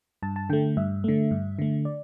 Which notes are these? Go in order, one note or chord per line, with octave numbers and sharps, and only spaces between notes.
G2 A5
A5
D3 A3 G5
G2 E5
D3 A3
G2
D3 A3
D5